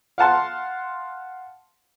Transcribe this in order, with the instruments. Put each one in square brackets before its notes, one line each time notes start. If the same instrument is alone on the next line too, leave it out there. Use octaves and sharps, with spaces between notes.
[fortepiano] F5 F#5 A5 C6